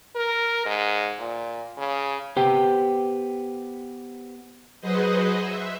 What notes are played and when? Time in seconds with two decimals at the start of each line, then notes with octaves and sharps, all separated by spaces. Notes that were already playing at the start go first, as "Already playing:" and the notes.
0.16 A#4
0.66 G#2
1.19 A#2
1.78 C#3
2.36 B3 G4 C5 G5
4.81 F#3 F#4 G#4 B4 C5 D#5
5.42 E5